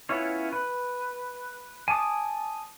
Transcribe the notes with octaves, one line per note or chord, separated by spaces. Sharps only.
B3 C#4 E4 F4 C#5
B4
G#5 A5 D6 D#6